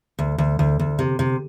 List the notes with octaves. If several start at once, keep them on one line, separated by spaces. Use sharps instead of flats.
D2
D2
D2
D2
C3
C3